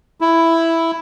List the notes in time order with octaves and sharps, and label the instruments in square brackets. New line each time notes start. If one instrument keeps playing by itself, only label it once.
[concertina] E4